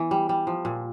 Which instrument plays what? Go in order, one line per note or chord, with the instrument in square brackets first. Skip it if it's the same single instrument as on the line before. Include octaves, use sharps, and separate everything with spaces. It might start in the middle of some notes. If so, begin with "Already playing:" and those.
Already playing: [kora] E3 B3
G3
G3
F3
A#2